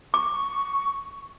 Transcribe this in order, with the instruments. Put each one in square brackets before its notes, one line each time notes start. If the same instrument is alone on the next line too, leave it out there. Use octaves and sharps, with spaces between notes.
[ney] C#6 [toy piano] D6